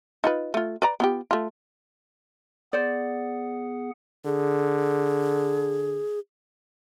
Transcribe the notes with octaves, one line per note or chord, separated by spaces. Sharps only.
D#4 F4 B4
A3 F4
B4 D5 A#5
B3 F4 G4
A3 F4
B3 G#4 C5 D5 F#5
D3 G#4